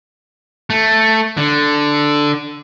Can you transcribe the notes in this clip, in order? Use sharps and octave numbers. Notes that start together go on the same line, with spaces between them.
A3
D3